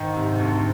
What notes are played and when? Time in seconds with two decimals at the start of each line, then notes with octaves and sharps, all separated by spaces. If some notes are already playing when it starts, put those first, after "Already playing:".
Already playing: G#2 D#3
0.16 C3
0.40 D2